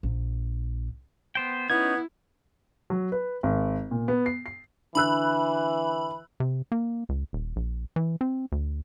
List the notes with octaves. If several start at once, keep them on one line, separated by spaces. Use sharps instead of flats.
A#1
B3 C5 G5
B3 C#4 D#4 E4 G#6
F#3
B4
G#1
A#2
B3
C7
C7
D3 E3 B5 E6 F#6
C3
A#3
C#2
D#1
A#1
E3
C4
D2